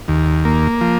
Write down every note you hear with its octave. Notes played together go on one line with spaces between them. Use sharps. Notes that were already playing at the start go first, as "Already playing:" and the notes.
D#2
A#3
F3